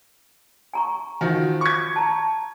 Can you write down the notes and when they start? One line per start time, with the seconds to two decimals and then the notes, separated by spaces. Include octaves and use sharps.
0.73 G#5 A#5 C#6
1.21 D#3 F3 F#4 G#5
1.61 C#6 G#6
1.96 A5 A#5